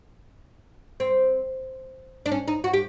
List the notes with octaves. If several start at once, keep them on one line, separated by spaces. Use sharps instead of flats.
C4
D4
C#4
D#4
F#4
G4